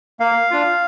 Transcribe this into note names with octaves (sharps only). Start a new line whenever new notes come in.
A#3 F5
D4 F4